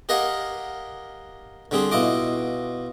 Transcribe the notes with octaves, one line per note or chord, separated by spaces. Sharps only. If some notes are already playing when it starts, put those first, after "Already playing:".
G4 A#4 D#5 F5 F#5 G#5
D3 G3 C4 G#4 C5
B2 E4 F4 D#5 D6